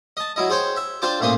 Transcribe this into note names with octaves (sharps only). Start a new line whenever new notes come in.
D#5 A5
F#3 E4 D#5
G#4 C5 C#5 G5
E5
D4 F4 C5 G5 A5 D6
A1 A#2 A#3 C5 D#6